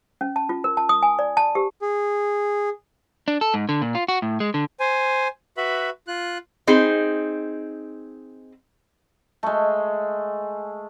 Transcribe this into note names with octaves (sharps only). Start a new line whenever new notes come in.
C#4
A5
F4
A#4
A5
D#6
G#5
D5
A5
G4
G#4
D4
A4
G#2
D3
A#2
F4
F#4
A2
G#3
D3
C5 G#5
F#4 B4 E5 B5
F4 F#6
C4 D#4 G#4
G#3 A3